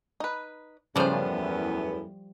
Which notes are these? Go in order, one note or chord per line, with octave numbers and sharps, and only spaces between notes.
D#4 B4
F#2 A2 C#3 F3 G3 B3 D4 C5
E2